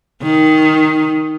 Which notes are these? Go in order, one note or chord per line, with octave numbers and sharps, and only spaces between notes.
D#3